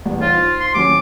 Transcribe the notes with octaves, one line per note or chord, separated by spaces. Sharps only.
E2 G2 B3
D#4 F4 C5 F5
C6
D#1 F#2 C#4 D6